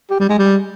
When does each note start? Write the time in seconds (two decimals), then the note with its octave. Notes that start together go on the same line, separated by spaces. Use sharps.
0.10 G4
0.20 G3
0.29 G#3
0.39 G3